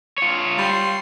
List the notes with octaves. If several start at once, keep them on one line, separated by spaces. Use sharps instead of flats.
F4 C#5
G3 C6